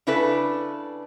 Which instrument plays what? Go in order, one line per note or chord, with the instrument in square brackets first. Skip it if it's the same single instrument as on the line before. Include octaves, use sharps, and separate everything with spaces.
[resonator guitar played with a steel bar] C#3 D4 E4 A4 B4